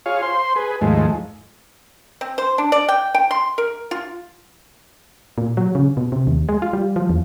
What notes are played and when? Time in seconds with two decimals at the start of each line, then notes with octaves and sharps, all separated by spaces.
0.06 F4 G#4 C#5 F5
0.22 C5 C6
0.56 G#4 B4
0.81 D#2 G#2 F3 G#3 A3
2.21 C4
2.38 C5
2.58 D4
2.72 D5
2.88 G5
3.14 G5
3.31 C6
3.58 A#4
3.91 F4
5.38 A#2
5.57 F#3
5.75 C#3
5.97 B2
6.12 C3
6.27 D#2
6.49 G#3
6.62 F4
6.73 G3
6.96 F3
7.09 E2